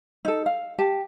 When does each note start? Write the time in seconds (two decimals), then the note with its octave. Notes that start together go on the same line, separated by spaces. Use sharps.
0.25 D#4 A4
0.46 F5
0.78 G4 A5